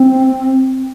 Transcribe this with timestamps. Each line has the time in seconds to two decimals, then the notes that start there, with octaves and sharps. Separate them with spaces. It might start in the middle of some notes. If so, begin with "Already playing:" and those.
Already playing: C4